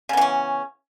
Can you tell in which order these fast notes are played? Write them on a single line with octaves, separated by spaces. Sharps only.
C#3 B3 E3 C#4